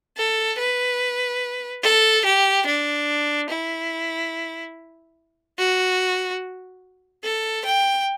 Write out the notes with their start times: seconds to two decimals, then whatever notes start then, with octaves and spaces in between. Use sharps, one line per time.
0.17 A4
0.58 B4
1.83 A4
2.25 G4
2.66 D4
3.49 E4
5.58 F#4
7.24 A4
7.65 G5